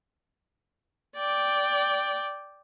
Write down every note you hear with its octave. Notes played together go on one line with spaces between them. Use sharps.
D5 G5